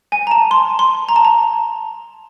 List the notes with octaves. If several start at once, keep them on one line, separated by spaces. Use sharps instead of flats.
G#5
A#5
A5
C6
C6
A#5
A5
A#5